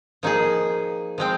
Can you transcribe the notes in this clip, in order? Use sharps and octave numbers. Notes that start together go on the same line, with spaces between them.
F3 A#3 D#4 G#4
F3 G#3 C4